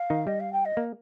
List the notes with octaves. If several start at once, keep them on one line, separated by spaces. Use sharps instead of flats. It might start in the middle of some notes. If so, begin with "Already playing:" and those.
Already playing: F5
D#3 D#4
G3 D#5
F5
G5
D#5
A#3